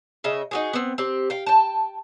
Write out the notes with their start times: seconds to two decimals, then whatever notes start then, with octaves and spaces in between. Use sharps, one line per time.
0.24 C#3 D#5 E5
0.51 D#4 F#4 G#4
0.73 B3 C4
0.98 C4 G4
1.30 F5 G5
1.47 G5 A5